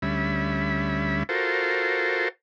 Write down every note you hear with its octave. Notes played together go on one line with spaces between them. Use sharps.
D2 G3 C#4 E5 B5
F4 F#4 A4 A#4 C5